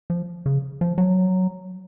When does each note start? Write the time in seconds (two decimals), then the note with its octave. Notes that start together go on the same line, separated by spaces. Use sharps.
0.10 F3
0.46 C#3
0.81 F3
0.98 F#3